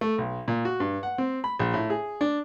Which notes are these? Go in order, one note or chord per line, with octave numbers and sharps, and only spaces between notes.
A3
B1
A#2
F#4
G2
F#5
C4
B5
A#1
A2
G#4
D4